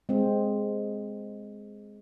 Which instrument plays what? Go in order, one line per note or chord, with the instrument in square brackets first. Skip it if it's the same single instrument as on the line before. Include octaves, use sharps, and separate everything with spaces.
[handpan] G#3 C4